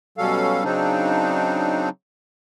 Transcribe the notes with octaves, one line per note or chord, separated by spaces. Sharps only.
B2 F#3 G3 C#4 A4 F5
C#3 F#3 C4 D4 D#4